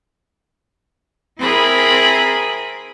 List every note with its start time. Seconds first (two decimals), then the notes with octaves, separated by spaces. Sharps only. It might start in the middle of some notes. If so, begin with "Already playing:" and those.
1.40 C4 E4 G#4 A#4 B5